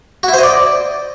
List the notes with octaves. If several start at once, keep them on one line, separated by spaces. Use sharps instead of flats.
F#4
E4
C5
D#5
D5